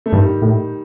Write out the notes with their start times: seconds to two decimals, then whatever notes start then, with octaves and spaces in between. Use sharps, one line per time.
0.06 A3
0.12 G2 D#3 G3
0.42 A2